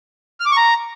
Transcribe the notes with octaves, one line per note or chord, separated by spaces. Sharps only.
F6
D6
C#6
A#5